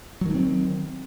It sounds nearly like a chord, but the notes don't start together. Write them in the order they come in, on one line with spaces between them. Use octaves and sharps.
F#3 D#3 A3 C4